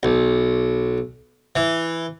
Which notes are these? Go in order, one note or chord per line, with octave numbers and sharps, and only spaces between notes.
B1
E3